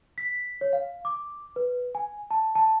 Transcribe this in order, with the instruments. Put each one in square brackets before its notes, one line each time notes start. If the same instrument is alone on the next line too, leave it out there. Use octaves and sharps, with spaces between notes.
[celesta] B6
C#5
F5
D6
B4
G#5
A5
A5